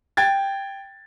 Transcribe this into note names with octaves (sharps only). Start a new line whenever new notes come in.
G5 G#6 A6